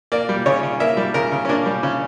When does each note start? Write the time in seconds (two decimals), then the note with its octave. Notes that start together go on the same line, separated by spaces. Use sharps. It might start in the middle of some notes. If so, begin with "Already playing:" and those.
0.12 A#3 D5
0.29 G3
0.46 C#3 C#5
0.63 C#3
0.80 A#3 E5
0.97 G3
1.14 C#3 A#4
1.32 C#3
1.45 C#4
1.49 A#3 D4
1.66 G3
1.83 C#3 C#4